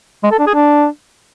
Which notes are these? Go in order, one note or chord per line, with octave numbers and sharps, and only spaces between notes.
G#3
A4
D4
G#4
D4